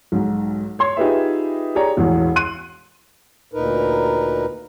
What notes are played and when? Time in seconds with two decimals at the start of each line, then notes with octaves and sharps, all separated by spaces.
0.12 B1 G#2
0.79 C#5 C6 G#6
0.97 D#4 F4 G4 G#4 B4 E5
1.75 G4 G#4 C#5 D5 A#5
1.97 E1 A1 E2
2.36 C6 F#6 D#7
3.54 D2 A#2 D#4 A#4 B4